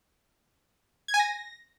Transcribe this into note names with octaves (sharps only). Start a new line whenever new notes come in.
G#6
G#5
A#6